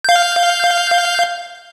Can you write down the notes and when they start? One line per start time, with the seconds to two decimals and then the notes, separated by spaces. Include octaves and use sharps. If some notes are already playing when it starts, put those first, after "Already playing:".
0.04 F5 G6